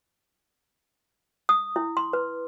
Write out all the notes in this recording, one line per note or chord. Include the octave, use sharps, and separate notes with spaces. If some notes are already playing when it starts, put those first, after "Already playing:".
D#6
E4
C6
B4